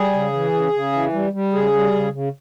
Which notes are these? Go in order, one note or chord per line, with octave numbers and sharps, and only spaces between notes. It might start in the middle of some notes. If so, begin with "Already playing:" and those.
Already playing: G3 G#4
C#3
E3
C#3
C#3
E3
G3
G3
C#3 G#4
G3
C#3
C#3